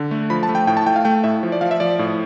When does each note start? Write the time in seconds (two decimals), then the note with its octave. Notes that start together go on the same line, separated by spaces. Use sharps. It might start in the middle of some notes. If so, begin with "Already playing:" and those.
Already playing: D3
0.11 A3
0.30 F3 B5
0.43 A5
0.49 A3
0.55 G5
0.67 A2 G5
0.77 A5
0.86 A3 G5
0.96 F5
1.05 A3 G5
1.24 A2 E5
1.43 F3
1.52 D5
1.61 F3 F5
1.71 E5
1.80 F3 D5
1.99 A2